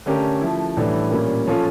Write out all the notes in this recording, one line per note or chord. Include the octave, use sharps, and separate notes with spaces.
D3 A3 C#4 G4 A#4
F3 A3 E4
A2 E3 G3 D4 A4
A#2 G3 A#3 C#4
F3 C#4 F4 A4